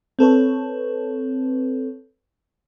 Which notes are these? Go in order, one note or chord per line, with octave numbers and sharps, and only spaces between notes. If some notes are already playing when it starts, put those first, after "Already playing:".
C4 A4 B4 C#5